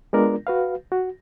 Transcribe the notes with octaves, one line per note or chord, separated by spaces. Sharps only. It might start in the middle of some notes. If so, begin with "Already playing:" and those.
G#3 B3 D4 F4 A#4 D5
F#4 B4 F5
F#4